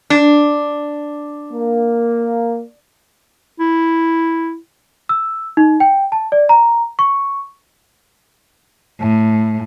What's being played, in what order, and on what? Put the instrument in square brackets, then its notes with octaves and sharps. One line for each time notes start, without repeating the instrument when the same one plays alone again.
[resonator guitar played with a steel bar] D4
[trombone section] A#3
[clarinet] E4
[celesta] E6
D#4
G5
A5
D5
A#5
C#6
[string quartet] A2